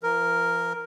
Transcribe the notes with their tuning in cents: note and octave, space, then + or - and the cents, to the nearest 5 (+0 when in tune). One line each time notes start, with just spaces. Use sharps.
F3 -45 A#4 +0